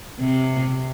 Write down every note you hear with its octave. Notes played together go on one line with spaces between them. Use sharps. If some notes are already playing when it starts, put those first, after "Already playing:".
C3